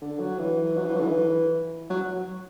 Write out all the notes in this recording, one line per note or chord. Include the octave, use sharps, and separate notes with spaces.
D3
F#3
E3
F#3
E3
F#3
D3
E3
F#3